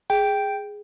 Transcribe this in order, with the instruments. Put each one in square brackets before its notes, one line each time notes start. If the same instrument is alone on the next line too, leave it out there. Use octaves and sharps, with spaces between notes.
[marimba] G#4 [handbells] G5